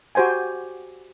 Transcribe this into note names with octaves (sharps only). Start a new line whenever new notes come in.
F#4 G4 C5 G5 G#5